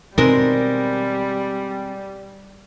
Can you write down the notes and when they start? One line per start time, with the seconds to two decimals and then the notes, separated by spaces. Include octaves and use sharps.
0.18 B2 D#3 G3 G#3 C4 A#4